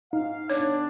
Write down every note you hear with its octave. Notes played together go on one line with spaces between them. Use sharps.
G#2 D#4 F5
C#3 B3 D4 C#5